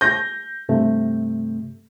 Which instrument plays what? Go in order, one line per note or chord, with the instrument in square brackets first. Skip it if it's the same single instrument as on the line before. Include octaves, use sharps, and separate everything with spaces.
[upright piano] G6 A#6
[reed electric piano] G2 C3 A3